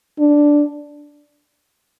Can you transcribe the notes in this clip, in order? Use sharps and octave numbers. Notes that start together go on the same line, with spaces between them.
D4